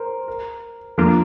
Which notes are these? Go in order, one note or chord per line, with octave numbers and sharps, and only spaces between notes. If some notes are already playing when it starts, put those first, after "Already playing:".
Already playing: A#4 C5
A#4
F2 F3 A#3 D4 F4 A#4